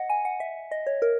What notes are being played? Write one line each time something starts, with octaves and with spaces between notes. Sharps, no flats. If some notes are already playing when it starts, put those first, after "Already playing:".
Already playing: D#5 F#5
G#5
F#5
E5
D#5
C#5
A#4